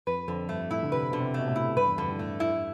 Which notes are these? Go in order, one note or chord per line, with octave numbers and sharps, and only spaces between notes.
F2 B4
F2 D3
G2 A3
A2 E4
D3
C3 B4
B2 D3
C3
B2 A3
A2
E4
G2 B4
E2
F2 D3
G2
A2 A3
E4